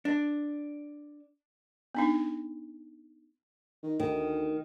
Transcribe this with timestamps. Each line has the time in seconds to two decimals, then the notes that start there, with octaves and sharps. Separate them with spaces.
0.05 D4
1.95 B3 D4 D#4
3.83 D#3
4.00 D2 D#3